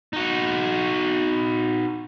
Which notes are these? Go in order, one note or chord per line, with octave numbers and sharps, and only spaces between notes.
D#4 F#4